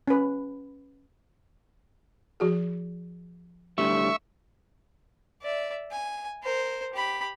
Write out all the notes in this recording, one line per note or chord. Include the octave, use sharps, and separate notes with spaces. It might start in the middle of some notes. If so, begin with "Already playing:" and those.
C#4 B4
F3 F#4 G#4
A2 D3 G3 E5 C#6
D5 E5
G#5
A#4 C5
G4 B5